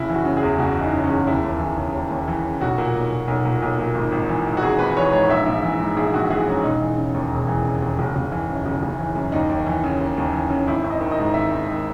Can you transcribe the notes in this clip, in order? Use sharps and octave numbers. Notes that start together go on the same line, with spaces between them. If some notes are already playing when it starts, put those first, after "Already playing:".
Already playing: F#1 E4
E3
F#4
C#3
G#4
E2
F#1 F#4
E3 D#4
C#3
C#4
E2
D#2 E4
D#2
E3
C#3
D#2
D#2
E3
C#3
B1 F#4
A#2
B1
A#2
B1
A#2
B1
A#2
G#1
G#1
E3
G#2
F#4
G#1 G#4
G#1 B4
E3 C#5
G#2 C#5
A#1 E5
A#1
E3
G#2
A#1 G#4
A#1 F#4
E3 G#4
G#2 C#4
E1 D#4
E3
C#3
D#2
E1
E3
C#3
D#2
F#1
F#1
E3
F#2
F#1
F#1
E3
F#2
D#2 D#4
D#2
E3
C#3
D#2
D#2
E3
C#3
G#1 E4
G#1
D#5
D#3
D#5
G#2
G#1 E5
G#1
D#3